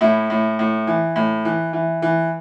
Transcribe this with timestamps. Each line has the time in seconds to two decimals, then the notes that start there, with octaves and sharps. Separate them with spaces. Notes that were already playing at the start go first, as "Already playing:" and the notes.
0.01 A2 E4
0.30 A2
0.59 A2
0.87 E3
1.16 A2
1.45 E3
1.73 E3
2.02 E3